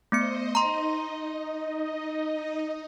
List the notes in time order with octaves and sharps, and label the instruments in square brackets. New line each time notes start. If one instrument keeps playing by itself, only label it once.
[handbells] A3 B3 C#7 [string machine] C5 D#5
[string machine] D#4 D#5 [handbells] A#5 C6